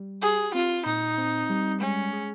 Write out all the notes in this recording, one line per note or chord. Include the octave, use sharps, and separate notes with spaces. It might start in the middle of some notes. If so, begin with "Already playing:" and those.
Already playing: G3
G4 G#4
C4 F4
A#2 D#4
C4
G3
G#3 C#4
G#4